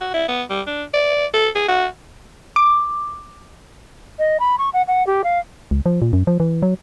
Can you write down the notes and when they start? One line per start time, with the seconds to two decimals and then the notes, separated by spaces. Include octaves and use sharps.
0.01 F#4
0.14 E4
0.28 B3
0.50 G3
0.67 D4
0.93 D5
1.34 A4
1.55 G#4
1.68 F#4
2.56 D6
4.19 D#5
4.40 B5
4.58 C#6
4.73 F#5
4.88 F#5
5.07 G4
5.24 F5
5.71 C#2
5.86 F3
6.02 A#2
6.13 F#2
6.27 F3
6.40 E3
6.63 F#3